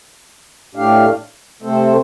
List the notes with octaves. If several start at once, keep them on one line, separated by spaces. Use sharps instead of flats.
A2 A3 D4 G4 F5
C3 A3 C4 A4 C5